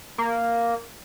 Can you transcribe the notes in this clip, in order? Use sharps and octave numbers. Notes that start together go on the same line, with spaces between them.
A#3